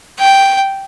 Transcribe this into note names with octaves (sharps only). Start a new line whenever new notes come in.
G5